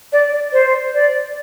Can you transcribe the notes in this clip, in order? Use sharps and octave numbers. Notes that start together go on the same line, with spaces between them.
D5
D5
C5
D5